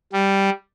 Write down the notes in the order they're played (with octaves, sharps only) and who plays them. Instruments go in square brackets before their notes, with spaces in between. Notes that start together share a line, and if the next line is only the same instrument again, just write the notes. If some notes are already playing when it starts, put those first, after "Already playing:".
[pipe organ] G3